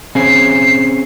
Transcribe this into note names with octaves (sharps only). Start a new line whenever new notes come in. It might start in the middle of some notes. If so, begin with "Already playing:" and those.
C4 C#4 G#4 C7